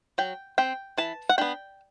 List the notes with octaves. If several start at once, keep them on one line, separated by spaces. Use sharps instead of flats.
F#3 G5
C4 G5
E3 A5
F#5
B3 D4 G5